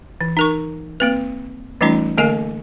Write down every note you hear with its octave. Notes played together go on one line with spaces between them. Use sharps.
E3
D#4 A#4 C#6
A#3 C4 B4
E3 G3 A3 C#4 D#4 F4
D3 A3 A#3 A#4 F5 G#5